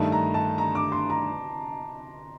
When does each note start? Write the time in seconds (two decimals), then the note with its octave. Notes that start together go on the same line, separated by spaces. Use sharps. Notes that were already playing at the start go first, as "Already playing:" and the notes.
Already playing: G2 D#3 A3 D#4 A5
0.12 A#5
0.34 A5
0.58 A#5
0.75 D6
0.92 C6
1.10 A#5